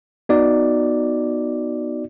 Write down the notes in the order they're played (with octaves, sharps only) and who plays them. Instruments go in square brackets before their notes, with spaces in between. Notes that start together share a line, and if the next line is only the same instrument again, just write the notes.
[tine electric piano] B3 D#4 F#4 D5